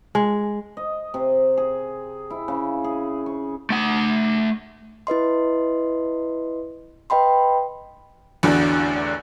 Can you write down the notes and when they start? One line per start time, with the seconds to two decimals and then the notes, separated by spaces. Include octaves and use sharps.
0.15 G#3
0.77 D#5
1.14 C3
1.57 G#4
2.30 E4
2.48 C#3
2.84 G#4
3.26 C#6
3.70 A3 F#5
5.07 E4 B4 D#5 C6
7.10 B4 D#5 G5 B5 C6
8.43 A1 E2 D3 F#4